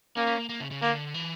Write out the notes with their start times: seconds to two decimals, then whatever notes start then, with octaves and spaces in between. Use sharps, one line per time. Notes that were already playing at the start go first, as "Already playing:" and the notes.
0.17 A#3 C#4
0.27 C#4
0.38 A#3
0.49 A#3
0.60 C#3
0.71 C#3
0.82 D3 A#3
1.14 E3